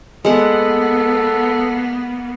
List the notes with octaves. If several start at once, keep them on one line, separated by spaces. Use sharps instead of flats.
G#3 A#3 B3 A4 F#5